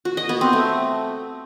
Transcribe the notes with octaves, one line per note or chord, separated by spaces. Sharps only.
F#4
D#5
B3
C4
A3